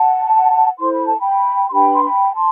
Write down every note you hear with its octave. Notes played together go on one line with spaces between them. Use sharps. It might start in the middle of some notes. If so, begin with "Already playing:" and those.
Already playing: F#5 A5
E4 A4 C5 C6
B5
A5
G5 B5
C6
D4 G4 B4 G5 B5
C6
G5 B5
A5 C6